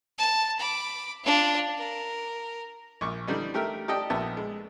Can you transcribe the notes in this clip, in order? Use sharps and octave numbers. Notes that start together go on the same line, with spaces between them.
A5
B5 D6
D4 F4
A#4
A#1 C#6 D6
D3 E3 G3 D4 D#4
A3 G4 A#4 E5 F6
G4 A4 D5 D#5 G5
A#1 B3 E5 A5
G#3